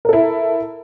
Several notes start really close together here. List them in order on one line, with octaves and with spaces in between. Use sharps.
A#4 A4 E4